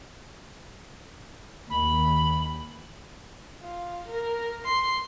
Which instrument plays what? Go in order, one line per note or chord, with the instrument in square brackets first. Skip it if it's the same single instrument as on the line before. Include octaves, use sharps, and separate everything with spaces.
[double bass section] D#2 [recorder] B5
[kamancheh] F4
A#4
C6